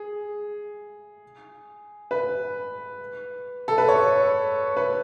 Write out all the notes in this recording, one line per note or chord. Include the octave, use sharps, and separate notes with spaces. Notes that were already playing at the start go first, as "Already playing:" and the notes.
Already playing: G#4
B4
A4
B4
C#5
B4